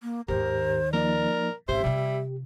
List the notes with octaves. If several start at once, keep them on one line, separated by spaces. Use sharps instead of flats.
A#3
D#2 G#2 D#3 G4 A#4 C5
F3 A#3 D#4 A#4 D5
G#1 C#3 G4 C5 E5
C3 G3 F4